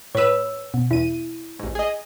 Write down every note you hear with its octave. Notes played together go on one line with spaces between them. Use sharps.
A2 B4 C#5 E6
B2
E2 E4 D#7
A1 G#2
G#4 D#5